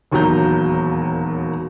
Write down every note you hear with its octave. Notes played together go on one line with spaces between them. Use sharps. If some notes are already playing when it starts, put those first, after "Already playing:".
E1 D#2 A#2 F#3 A#5 G6